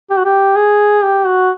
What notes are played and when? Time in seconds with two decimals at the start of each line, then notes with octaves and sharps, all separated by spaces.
0.10 G4
0.17 F#4
0.25 G4
0.56 G#4
1.03 G4
1.26 F#4